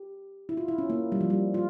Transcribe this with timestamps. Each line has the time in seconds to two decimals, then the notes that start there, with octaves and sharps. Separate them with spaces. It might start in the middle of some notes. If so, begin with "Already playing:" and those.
Already playing: G4
0.49 E4
0.57 F4
0.68 E4
0.78 C#4
0.90 A#3
1.12 G3
1.21 F3
1.30 G3
1.54 F4